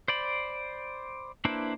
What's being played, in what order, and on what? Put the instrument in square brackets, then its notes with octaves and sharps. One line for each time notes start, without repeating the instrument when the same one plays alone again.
[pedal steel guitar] C5 D5 B5
A#3 D4 E4 B4 C5